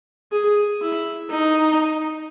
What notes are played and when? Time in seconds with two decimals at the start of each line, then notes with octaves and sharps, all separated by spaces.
0.32 G#4
0.81 E4
1.31 D#4